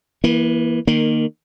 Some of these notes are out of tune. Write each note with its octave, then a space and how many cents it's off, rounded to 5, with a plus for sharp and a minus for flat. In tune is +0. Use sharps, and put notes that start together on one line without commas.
E3 +0 A#3 +35
D#3 -20 A#3 +0